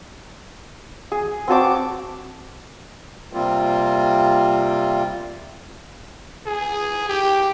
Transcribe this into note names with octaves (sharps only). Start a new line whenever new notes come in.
G#4
C4 F#4 A5 D6
C3 G3 A#3 C4 F4
G#4
G4